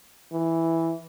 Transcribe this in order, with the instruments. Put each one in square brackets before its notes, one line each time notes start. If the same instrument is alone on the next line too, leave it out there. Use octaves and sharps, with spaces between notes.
[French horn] E3